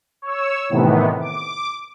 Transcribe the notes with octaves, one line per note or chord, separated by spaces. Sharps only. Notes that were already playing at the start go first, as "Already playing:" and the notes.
C#5 E6
A2 C3 D#3 E3 B3
D6